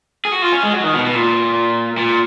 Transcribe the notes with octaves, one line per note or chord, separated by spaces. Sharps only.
G#4
F#4
F4
C#4
G#3
F#3
D#3
B2
B2
A#2
A#2